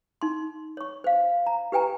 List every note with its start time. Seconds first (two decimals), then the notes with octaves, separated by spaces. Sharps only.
0.21 D#4 C6
0.77 C#5 C#6
1.04 C5 F5
1.47 A#5
1.72 G4 B4 G5 G#5 A#5